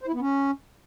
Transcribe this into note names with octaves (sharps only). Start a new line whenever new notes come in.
C5
E4
B3
C#4